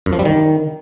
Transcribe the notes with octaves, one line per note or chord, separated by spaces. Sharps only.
F#2
F3
G3
D#3